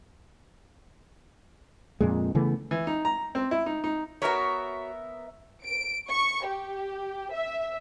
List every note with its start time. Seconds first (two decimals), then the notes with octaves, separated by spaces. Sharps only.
2.01 F2 A#2 G#3
2.35 C#3 E3 A3 B3
2.71 E3
2.87 D#4
3.05 A#5
3.35 C4
3.51 E4
3.66 D#4
3.84 D#4
4.22 B3 F#4 A#4 C#5 E5
5.62 D7
6.09 C#6
6.46 G4
7.33 E5